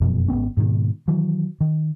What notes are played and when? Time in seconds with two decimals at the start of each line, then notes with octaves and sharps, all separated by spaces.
0.01 F1 F#2 B2 F3
0.28 G#1 A2 B3 C#4
0.57 G#2 B2 D3 D#3
1.08 D#3 E3 F#3
1.61 D#3